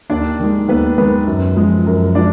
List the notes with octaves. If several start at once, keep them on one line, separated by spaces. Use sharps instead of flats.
D#2 D4 D5
D#3 G#3
D#2 B3 B4
D#3 G#3 B3 B4
F#2
F3 G#3
F#2 A#4
F3 G#3 D4 D5